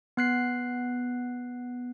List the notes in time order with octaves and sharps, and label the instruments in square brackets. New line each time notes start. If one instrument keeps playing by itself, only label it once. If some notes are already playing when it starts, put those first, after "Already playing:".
[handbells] B3 F#6 C7